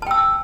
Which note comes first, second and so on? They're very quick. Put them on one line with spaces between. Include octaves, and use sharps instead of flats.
A5 G5 E6